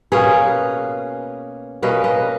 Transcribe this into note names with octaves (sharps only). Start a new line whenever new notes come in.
B2 A#3 C#4 G#4 B4
B2 A#3 C#4 B4 D#5
B4 D#5